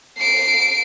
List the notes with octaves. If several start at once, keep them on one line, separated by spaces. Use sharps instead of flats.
C7 D7